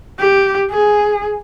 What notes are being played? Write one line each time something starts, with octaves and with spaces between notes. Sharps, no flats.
G4
G#4